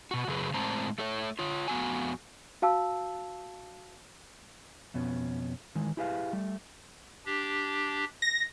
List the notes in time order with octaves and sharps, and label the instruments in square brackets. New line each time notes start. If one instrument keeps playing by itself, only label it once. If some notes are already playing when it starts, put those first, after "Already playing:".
[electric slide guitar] B2 F#4
F#2 C#3 F#3 G#4 B4
A2 G#3 C4 C5 A5 A#5
A3 A4 C#5
F4 C#5
F2 B3 F#4 G#5
[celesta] F#4 F5 A5 E6
[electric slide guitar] F2 B2 B3 C#4
D#3 E3 G#3
E4 G4 G#4 B4 D5 F5
G3 A3
[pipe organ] D4 G4
[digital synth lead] A#6